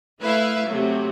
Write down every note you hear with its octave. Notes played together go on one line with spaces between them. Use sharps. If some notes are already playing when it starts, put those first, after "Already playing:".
A3 E4 B4 E5 F5
C3 F#3 A3